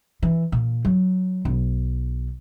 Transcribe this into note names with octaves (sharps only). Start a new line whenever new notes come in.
E3
A#2
F#3
B1